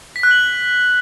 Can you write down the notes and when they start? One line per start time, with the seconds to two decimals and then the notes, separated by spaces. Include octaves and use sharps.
0.16 B6
0.23 F#6
0.31 F#7